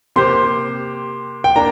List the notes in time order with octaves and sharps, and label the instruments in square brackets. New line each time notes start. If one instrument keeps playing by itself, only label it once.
[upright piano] C3 A#3 G4 C5 [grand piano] C6
[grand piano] G5
[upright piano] A#3 D4 [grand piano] A#5